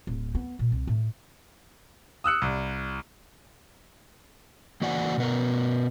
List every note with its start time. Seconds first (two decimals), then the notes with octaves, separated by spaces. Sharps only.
0.07 D1
0.35 B3
0.59 A#2
0.72 C2
0.87 A2
2.24 D#6 E6 F#6 C#7
2.42 C2
4.81 E3 A#3 F#4 D5 F#5 G#5
5.18 B2 B3 A#4